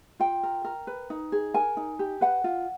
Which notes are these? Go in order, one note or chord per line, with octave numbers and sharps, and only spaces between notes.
F4 G5
A#4
A#4
B4
D#4
G#4
A#4 G#5
D#4
G4
B4 F#5
F4